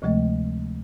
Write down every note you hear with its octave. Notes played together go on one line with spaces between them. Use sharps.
D2 C3 F3 G#3 A3 D#5